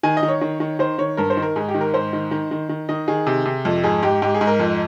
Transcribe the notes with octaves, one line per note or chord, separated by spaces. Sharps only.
D#3 G#5
D#5
D#3
C#5
D#3
D#3
D#3 C5
D#3 C#5
G2 A#4
C5
D#3
A#4
G#2 G#4
G4
D#3
A#4
G#2 C5
D#3
D#3
D#3
D#3
D#3 D#5
D#3 G#4
C3
C3
F2
G#2 G#4
G#2 G4
G#2 G4
G#4
G#2
A#4
F2